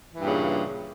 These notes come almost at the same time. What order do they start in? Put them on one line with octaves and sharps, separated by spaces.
E3 G2 A#2 C#3